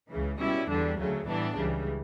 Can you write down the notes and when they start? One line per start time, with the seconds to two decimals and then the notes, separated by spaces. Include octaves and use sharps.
0.10 C#2 C#3 E3
0.39 B2 G3 C#4 E4
0.69 E2 D3 G3 D4
0.99 D2 C#3 F#3 A3
1.28 A2 E3 G3 B3 D4
1.57 C#2 C#3 E3 G3